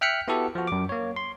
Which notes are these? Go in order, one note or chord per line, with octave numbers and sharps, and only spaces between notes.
E5 G5 F6 F#6 B6 C#7
B3 E4 F#4 G4 A4
F3 F#4
F#2 D6
A#3 C#5
C6